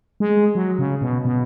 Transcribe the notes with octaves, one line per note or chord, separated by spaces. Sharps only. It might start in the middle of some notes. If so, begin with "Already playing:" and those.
G#3
F#3
C#3
B2
B2